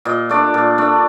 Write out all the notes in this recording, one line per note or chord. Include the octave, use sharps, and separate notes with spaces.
A#2 D#5
A3 D4 D5
A#2
A3 D4